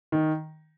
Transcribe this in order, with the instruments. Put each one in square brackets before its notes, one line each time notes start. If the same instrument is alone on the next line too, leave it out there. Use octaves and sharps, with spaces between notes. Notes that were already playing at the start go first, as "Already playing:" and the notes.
[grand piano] D#3